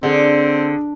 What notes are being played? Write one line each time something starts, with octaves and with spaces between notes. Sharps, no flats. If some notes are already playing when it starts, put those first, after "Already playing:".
D3 C4 D4 G#4